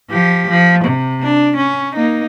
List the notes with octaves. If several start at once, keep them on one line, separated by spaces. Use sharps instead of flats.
F3 G4
F3
C3
D4
C#4
A#3 D#4